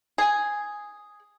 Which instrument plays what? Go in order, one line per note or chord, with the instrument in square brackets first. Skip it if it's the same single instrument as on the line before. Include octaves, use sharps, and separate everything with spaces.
[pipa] G#4